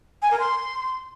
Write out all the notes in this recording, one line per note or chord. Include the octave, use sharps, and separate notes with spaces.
G#5
A#4
C6